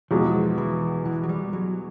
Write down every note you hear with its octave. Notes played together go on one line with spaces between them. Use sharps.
E2 B2 F3 G#3
E3
E3
F#3
G3
F#3